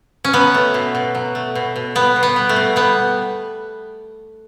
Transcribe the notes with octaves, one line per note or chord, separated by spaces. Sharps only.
C#4
F#3 B3
A3
B2
B2
F#3
A3
B2
B2
G3 B3
B2
B3
G3
A3
B2
G3 B3